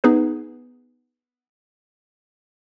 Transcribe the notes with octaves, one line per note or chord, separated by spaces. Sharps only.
B3 D#4 G#4 B4